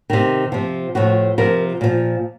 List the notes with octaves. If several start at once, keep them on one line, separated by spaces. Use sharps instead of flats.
C3 D#3
C3 F3
A2 F3 F#4
C3 F3 A#4
A#2 F3